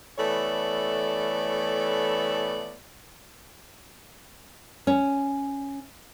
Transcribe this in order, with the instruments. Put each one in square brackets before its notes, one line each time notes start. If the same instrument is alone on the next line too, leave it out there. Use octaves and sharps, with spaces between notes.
[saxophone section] E3 A3 B3 A4 C#5 D5
[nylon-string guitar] C#4